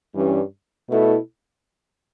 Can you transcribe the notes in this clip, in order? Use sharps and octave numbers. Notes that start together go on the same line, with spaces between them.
G2 E3 G3 C#4
B2 A3 E4 A4